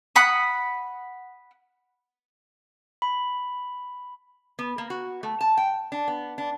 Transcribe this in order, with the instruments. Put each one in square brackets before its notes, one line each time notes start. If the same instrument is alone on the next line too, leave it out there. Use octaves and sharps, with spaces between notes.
[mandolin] F#5 B5 D#6
[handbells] B5
[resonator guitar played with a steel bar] B3
A#3
F#4
A3
A5
G5
D4
B3
D4